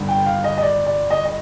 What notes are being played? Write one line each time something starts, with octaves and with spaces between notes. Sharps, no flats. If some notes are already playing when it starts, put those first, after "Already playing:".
Already playing: G1 G2 D3 G3
G5
F5
D#5
D#5
D5
D5
D#5
D#5